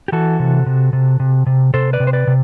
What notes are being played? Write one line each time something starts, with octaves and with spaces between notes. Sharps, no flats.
G4
E3 F#4 A4
C3
C3
C3
C3
C3
C3 A4 C5
B4 D5
C3
C5
B4 D5
C3